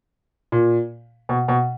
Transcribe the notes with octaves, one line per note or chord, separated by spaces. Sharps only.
A#2
B2
B2